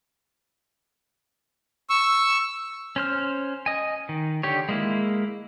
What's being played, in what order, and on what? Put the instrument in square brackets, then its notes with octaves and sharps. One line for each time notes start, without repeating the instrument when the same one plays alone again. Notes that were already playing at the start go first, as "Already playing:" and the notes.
[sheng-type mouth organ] C#6 E6
[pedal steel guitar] C#4 C5 F6
D#5 G#5
D#3
D3 G4 C#5
G#3 A#3 E4